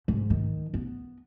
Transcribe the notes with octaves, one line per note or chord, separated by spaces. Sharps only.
G#2
D#3
B3